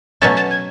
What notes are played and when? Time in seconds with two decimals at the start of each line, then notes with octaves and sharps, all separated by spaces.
0.22 B2 F#3 A3 C#4 A6
0.37 A6
0.51 G#6